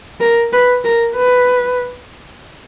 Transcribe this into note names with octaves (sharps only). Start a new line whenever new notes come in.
A#4
B4
A#4
B4